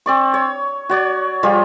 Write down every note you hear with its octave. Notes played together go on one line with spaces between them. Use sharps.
C4 D5 C#6
C#5
F#4 C#5 D5
F3 G3 F4 G#4